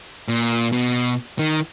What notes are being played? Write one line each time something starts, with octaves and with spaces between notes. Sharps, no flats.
A#2
B2
D#3